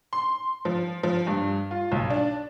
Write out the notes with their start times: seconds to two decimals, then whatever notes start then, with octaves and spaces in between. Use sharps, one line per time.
0.13 C6
0.65 F3
1.03 F3
1.27 G2
1.71 F4
1.92 B1
2.10 D4